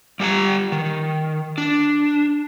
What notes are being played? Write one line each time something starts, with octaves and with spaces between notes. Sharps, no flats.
G3 G4 G#5 A#5
D#3
D4